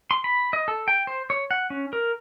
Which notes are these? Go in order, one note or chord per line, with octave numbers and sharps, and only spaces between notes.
C6
B5
D#5
A4
G5
C5
C#5
F#5
C#4
A#4